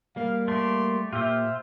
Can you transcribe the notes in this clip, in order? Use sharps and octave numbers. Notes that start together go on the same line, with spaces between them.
G3 A#3 F5
A3 G4 C6
A#2 F4 G4 C5 E5